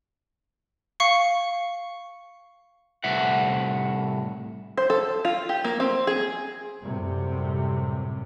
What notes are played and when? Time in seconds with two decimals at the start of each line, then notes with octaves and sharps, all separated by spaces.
1.00 F5 C#6 C#7
3.04 C2 A2 E5 F#5
4.77 C5
4.90 A4
5.25 F4
5.49 G4
5.65 A#3
5.80 C4
6.07 G#4
6.83 F#2 A2 C3 G3